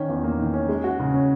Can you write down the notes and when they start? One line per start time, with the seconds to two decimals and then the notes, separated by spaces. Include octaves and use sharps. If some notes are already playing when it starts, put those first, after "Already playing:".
Already playing: D#3 C#4
0.09 E2
0.24 A#3
0.38 D#3
0.54 C#4
0.69 G#3
0.84 F#4
1.00 C#3
1.14 C#4